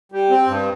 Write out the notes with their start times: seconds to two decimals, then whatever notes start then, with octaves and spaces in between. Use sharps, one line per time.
0.12 G3
0.30 C4
0.47 G2